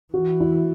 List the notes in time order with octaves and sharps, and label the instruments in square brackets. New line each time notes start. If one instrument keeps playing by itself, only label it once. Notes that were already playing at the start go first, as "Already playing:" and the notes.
[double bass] E3 [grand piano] F#4
[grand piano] E4